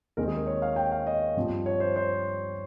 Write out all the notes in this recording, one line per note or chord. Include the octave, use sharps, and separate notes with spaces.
D#2 D#3 G#3 C4 A#4
G#4
A#4
C#5
F5
G5
F5
D#5
G2 F3 C4
C#5
C5
C5